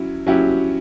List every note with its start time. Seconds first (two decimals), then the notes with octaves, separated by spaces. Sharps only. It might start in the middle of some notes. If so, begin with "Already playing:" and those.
Already playing: F#3 C#4 E4
0.27 F#3 C#4 E4 G4